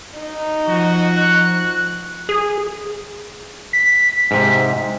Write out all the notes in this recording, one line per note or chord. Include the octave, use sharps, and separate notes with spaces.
D#4
F3 F#4
F#6
G#4
B6
G#2 C3